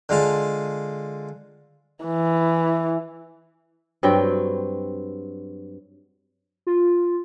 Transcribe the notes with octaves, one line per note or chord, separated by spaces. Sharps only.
D3 G#3 F4 A5
E3
G2 F#3 C4 G5
F4